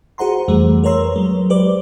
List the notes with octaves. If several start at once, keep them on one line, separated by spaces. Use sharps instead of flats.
F#4 G#4 C5 F#5 A#5 C6
F2 E3 G3 A3
A#4 B4 C#5 A#5 C6 E6
F#3 G#3
G4 B4 C5 D5 D6